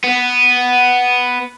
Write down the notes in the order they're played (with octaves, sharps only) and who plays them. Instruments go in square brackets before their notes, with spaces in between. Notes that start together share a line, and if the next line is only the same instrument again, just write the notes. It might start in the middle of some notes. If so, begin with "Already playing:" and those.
[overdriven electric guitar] B3